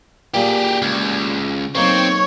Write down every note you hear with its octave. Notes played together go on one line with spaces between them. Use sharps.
A#2 G3 A#3 G4 G#4
C#2
B1 A#3 C4 D#4 C#5